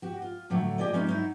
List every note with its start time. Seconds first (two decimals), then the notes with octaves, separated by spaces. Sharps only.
0.02 F#4 G4
0.22 F4
0.50 A2 D3 F#3 A3
0.78 G4 G#4 D5 D#5
0.93 G3 G#3 C#4 D#4 E4 D5
1.07 F#3 D#4 E4